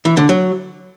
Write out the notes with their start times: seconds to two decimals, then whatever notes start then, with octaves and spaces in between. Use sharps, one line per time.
0.05 E3
0.17 D3
0.29 F#3